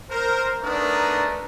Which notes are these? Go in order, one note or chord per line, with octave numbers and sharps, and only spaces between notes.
A#4 C5
A3 B3 D4 D#4 A#4 B4